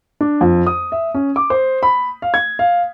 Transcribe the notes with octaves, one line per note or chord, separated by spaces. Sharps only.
D4
F2
D#6
E5
C#4
D6
C5
B5
F5
G#6
F5